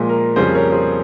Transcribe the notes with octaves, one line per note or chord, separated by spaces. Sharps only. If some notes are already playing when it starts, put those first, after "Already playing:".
Already playing: A#2 F3 G#3
A#4
F2 C#3 G3 A#3 G#4 C5
A#4 C#5
G#4 C5